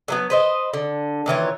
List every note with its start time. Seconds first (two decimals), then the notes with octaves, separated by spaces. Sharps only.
0.08 D3 F#3 B3
0.30 B4 C5 D#5
0.74 D3
1.26 A#2 D#3 E3 C#5